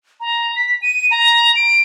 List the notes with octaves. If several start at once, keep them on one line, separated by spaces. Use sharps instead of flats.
A#5
B6
D#7
A#5
D7